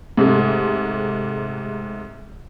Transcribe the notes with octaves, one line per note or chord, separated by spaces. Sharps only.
G#2 C3 G#3 A3